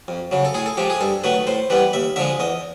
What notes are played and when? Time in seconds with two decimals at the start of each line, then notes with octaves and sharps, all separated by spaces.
0.08 F2
0.31 C#3 F#3
0.45 A4
0.54 A2 G#4
0.66 A4
0.77 F3 G#3 G4
0.90 G#4
1.01 G2 A4
1.24 D#3 F#3 A3 B4
1.47 A2 C5
1.70 E3 G3 B3 B4
1.93 D#2 E5
2.16 D3 F3 G#3 E5
2.40 E2 D#5